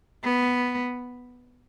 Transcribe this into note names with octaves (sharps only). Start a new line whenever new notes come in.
B3